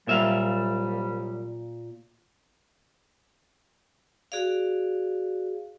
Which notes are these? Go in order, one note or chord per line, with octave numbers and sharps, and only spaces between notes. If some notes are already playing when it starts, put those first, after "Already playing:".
C2 A#2 F#3 G3 E5 F5
F#4 G#4 D5 F5